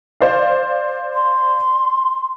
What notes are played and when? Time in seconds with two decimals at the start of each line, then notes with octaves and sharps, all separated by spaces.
0.21 C5 D5 F5
1.13 C6